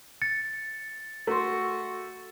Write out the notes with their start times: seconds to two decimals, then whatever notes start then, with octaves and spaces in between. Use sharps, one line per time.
0.22 A6 C#7
1.27 A3 F#4 C6